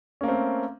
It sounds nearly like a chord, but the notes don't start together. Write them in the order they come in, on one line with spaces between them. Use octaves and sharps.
C#4 A#3 A3 C4